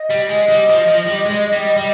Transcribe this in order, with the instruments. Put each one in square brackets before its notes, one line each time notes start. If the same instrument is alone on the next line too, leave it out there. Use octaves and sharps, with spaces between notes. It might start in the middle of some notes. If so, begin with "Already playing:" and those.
Already playing: [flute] D#5
[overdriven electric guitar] G3
G#3
G3
F3
F3
G3
G#3
G3
G3